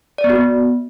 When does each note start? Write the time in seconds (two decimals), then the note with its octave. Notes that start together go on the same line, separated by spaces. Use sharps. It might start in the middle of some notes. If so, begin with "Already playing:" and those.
0.18 D5
0.24 B3
0.30 F#4
0.36 B3